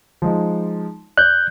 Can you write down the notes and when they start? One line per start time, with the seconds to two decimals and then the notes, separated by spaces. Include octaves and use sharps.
0.22 F3 G#3 D#4
1.18 D5 F#6 G6